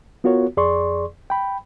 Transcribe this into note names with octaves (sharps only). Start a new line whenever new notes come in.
B3 F4 F#4 A#4 C#5
F2 G#4 D5 C6 C#6
G5 B5